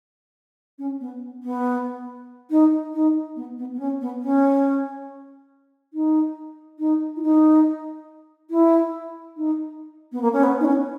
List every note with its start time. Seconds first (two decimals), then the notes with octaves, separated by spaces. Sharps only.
0.79 C#4
1.00 B3
1.43 B3
2.50 D#4
2.94 D#4
3.36 B3
3.58 B3
3.74 B3
3.79 C#4
4.01 B3
4.22 C#4
5.94 D#4
6.79 D#4
7.16 E4
7.22 D#4
8.50 E4
9.37 D#4
10.12 B3
10.22 A#3
10.33 C#4
10.43 B3
10.60 D#4
10.65 C#4